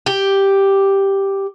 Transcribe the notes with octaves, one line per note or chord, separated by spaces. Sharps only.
G4